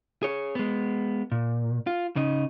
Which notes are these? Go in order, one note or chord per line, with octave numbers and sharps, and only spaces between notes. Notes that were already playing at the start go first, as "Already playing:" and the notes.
G#4 C#5
G#3 B3
A#2
F4
C#3 D#4